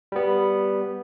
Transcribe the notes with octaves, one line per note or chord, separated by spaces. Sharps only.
G3 B3